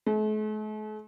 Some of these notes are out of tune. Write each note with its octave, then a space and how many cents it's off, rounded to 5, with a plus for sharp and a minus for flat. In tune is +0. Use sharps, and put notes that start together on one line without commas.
A3 -45